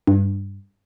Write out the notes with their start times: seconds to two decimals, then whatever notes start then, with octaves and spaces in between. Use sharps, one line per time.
0.07 G2